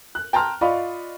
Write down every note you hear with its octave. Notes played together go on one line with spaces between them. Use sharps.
F#6
G5 A5 A#5 C6 F6
F4 D5 D#5 F5 B5 C#6